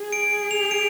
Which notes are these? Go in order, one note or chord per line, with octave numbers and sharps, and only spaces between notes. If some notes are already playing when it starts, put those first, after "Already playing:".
Already playing: G#4
D7
F7
D7